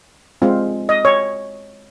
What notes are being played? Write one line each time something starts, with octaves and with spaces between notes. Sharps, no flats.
G#3 C4 F4
D#5
C#5